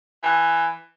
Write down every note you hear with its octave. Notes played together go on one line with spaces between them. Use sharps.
E3